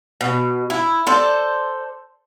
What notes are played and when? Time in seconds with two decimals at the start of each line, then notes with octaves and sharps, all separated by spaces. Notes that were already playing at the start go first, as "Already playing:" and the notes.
0.21 B2
0.70 E4
1.07 A4 C5 D5